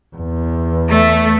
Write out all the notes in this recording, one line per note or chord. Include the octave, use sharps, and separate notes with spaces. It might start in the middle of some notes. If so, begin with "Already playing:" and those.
E2
A3